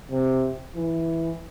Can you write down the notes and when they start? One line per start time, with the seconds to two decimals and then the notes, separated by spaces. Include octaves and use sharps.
0.12 C3
0.76 E3